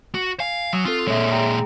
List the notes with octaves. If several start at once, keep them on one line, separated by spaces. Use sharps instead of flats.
F#4
F5 G#5
F#3 D#6 E6
C4 F4 A4
A#2 G#3 C#5 E5
G#4 G5 A#5